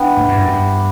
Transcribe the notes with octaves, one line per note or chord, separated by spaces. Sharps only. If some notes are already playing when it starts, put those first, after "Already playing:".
Already playing: E3 B3 D4 G4
A2
G2
F#2
G2